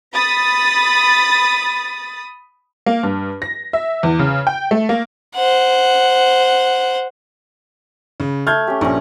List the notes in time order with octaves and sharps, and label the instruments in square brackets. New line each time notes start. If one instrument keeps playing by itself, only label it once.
[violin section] B5 D#6 A6
[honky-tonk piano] A#3
G2
A#6
E5
E2
C#3
G5
A3
A#3
[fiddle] C5 F#5
[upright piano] C#3
[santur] A3 [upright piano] F6 G6 G#6
[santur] C#4 G4
[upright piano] A#1 [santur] C#4 C#5